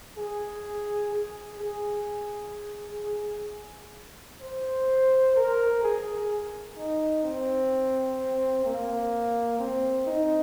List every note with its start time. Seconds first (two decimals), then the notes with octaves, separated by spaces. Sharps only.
0.17 G#4
1.11 G#4
1.59 G#4
4.41 C5
5.35 A#4
5.82 G#4
6.77 D#4
7.23 C4
8.65 A#3
9.59 C4
10.06 D#4